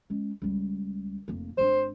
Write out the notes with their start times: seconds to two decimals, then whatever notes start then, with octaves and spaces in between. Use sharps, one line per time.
0.10 G#3 C#4
0.42 C#2 G3
1.28 F1 A#3
1.58 G#1 D4 C5